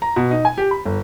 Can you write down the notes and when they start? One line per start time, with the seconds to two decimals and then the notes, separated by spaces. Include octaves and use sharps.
0.02 A#5
0.16 B2
0.31 D#4
0.45 G#5
0.58 G4
0.71 B5
0.85 G1